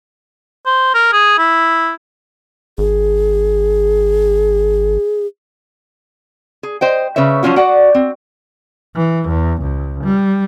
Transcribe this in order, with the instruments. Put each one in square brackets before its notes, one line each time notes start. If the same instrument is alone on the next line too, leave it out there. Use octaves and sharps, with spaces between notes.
[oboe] C5
A#4
G#4
E4
[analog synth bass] G#1 [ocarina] G#4
[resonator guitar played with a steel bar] G#4
C5 D#5 G5
C#3 B4 C#5 E5
F3 F#3 C#4 F4 F#4
F#4 D5 F#5
C4
[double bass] E3
E2
C#2
G3